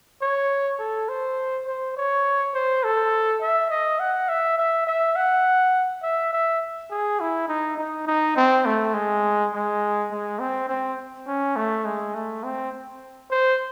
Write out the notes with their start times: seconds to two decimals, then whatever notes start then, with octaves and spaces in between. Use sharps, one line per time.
0.22 C#5
0.80 A4
1.09 C5
1.67 C5
1.97 C#5
2.55 C5
2.84 A4
3.42 E5
3.70 D#5
3.99 F#5
4.29 E5
4.58 E5
4.87 E5
5.16 F#5
6.03 E5
6.33 E5
6.91 G#4
7.20 E4
7.49 D#4
7.78 D#4
8.07 D#4
8.36 C4
8.66 A3
8.94 G#3
9.53 G#3
10.11 G#3
10.40 C4
10.69 C4
11.27 C#4
11.56 A3
11.85 G#3
12.15 A3
12.44 C4
13.31 C5